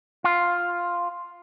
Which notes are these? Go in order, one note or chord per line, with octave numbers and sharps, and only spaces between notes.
F4